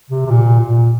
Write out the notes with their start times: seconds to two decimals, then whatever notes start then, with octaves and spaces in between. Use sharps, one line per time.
0.10 C3
0.26 C3
0.31 A#2
0.61 A#2